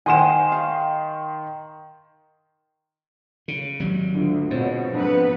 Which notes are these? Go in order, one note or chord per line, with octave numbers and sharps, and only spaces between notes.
D#3 C5 F#5 G#5 C6 E7
F5
C#3
G#1 F#3 G3
D2 D3 F4
G#2 B2 C4 F4 C#5
F2 B3 D4 B4